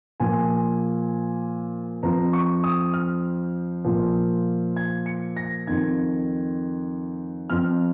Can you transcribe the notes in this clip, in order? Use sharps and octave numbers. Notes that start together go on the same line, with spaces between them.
A#2 F3 G#5
F2 F3 A#5
C#6
D#6
F6
A#2 F3
G#6
C#7
A#6
F2 D#3 G#6
F2 F3 F6